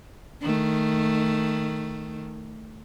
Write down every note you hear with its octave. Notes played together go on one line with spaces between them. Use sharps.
D#3 A3